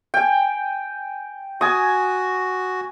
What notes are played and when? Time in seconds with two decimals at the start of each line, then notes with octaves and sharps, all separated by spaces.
0.14 G5 G#5
1.61 F#4 G#5 D#6